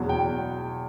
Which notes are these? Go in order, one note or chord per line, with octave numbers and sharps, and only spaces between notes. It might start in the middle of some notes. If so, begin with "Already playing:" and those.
Already playing: E2 B2 F#3
G5